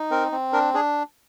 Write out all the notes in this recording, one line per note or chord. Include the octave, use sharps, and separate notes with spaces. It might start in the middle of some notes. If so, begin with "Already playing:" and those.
Already playing: D#4
C4 A#4
C4
D4 A#4
D4 G#4